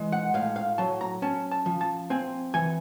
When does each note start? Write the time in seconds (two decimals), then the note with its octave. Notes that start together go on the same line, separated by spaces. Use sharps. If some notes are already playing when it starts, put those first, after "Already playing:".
Already playing: E3 G#3
0.12 F#5
0.34 A2 F5
0.56 F5
0.78 F#3 A5
1.01 A#5
1.22 C#4 A5
1.51 A5
1.66 F3
1.81 A5
2.10 C4 G#5
2.54 E3 G#5